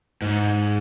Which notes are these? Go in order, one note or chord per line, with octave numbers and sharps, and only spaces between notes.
G#2